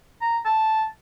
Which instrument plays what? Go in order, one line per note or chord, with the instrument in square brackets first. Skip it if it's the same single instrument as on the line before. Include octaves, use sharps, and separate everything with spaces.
[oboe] A#5
A5